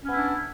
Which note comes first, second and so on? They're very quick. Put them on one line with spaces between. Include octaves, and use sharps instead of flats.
C#4 B3 E4 D4